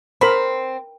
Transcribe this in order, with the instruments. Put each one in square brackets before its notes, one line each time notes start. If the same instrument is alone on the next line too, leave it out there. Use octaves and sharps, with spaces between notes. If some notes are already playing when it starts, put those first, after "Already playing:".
[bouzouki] C4 [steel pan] A#4 B5